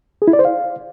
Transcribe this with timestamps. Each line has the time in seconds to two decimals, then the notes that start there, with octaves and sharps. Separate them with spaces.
0.22 G#4
0.28 E4
0.33 D5
0.39 C5
0.45 F5